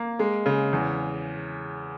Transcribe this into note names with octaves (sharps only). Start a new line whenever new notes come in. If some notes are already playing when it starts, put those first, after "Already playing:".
Already playing: A#3
G#3
C#3
E2